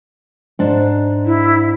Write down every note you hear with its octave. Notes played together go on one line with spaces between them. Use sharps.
G#2 D4
E4